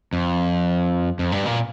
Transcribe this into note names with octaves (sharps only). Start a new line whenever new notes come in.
F2
F2
G2
A#2